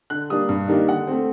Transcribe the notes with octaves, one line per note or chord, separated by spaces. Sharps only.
D3 F#6
G3 A#3 D4 D#6
G2
D#3 G3 A#3 D4
D3 F#5
A3 C4